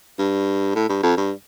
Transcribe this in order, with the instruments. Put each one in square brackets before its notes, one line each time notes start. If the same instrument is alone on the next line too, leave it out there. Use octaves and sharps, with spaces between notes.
[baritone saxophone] G2
A2
G2
F2
G2